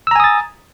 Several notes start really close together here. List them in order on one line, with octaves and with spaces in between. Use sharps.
E6 A#5 G#5 D#6 A6